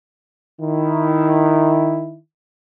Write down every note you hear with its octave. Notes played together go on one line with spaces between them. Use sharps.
D#3 E4